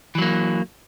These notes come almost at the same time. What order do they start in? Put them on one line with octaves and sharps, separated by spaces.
E3 F#3 A#3